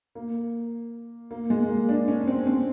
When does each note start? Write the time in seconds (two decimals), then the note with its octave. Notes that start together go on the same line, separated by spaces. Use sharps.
0.15 A#3
1.31 A#3
1.50 G#3
1.69 A#3
1.89 D4
2.08 C#4
2.27 C4
2.46 C4